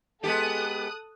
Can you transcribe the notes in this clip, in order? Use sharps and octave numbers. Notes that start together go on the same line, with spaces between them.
G#3 B3 G4 A4 D#6 F#6